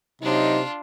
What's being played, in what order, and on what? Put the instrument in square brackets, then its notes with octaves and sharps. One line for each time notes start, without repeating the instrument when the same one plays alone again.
[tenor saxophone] C3 [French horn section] F#3 D#4 [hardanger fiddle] D4 F4